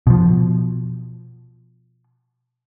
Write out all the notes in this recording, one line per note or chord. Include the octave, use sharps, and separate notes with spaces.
B2 F3